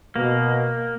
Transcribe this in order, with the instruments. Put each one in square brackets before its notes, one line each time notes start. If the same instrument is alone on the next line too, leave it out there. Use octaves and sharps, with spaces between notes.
[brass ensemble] B2 [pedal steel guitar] A#3